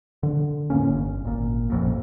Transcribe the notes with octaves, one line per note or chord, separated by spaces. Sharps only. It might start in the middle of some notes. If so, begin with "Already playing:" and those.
D3
E2 A2 A#3 C#4
G1
G#1 A#2
A1 F2 A#2